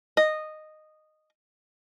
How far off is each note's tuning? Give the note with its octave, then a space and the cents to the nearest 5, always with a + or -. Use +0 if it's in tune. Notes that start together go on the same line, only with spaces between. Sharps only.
D#5 -10